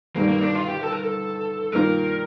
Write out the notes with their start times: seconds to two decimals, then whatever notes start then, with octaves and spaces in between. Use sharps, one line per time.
0.16 G1 G2 D#3 G3 A#3
0.28 A#3
0.41 D4
0.55 F4
0.68 G4
0.81 A4
0.93 A#4
1.03 A4
1.72 G2 D#3 A#3 F4 A#4